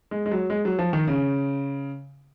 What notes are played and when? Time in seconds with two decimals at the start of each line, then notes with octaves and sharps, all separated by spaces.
0.11 G#3
0.26 G#3
0.32 F#3
0.50 G#3
0.65 F#3
0.79 F3
0.93 D#3
1.07 C#3